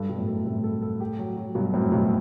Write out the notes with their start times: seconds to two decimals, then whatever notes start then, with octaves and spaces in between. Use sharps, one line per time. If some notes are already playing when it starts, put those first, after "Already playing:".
Already playing: G2 A4
0.09 B2 G3
0.18 F#2 A2
0.27 A4
0.45 A2 C3 A4
0.64 A4
0.82 A4
1.00 G4
1.19 F#3
1.37 F#3
1.55 G2 B2 F#3
1.74 F#2 A2 C4
1.92 G2 B2 F#3